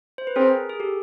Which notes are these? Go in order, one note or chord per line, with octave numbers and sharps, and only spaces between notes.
C5
B4
C4 G#4 A#4
G#4
G4 A4